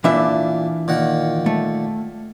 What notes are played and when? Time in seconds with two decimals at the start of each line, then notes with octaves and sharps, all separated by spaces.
0.04 A#2 E3 D4 E5
0.88 A#2 D#3 F#5
1.46 A3